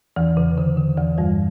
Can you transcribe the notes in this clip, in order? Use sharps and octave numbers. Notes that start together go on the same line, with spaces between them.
E2 E3
C#3
D3
D3
E2 E3
G2 G3